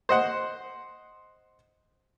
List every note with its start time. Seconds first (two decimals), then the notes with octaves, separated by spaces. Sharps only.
0.09 C5 D#5 F#5